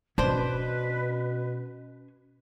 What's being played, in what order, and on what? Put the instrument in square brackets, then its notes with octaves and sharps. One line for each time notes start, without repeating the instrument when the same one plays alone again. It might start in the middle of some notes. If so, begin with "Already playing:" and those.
[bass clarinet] B2 [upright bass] C#4 [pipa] D4 C5 [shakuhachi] B4